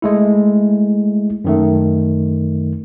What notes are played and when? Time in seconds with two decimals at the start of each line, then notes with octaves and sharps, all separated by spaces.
0.02 G#3 A3 E4
1.44 F#2 D#3 A3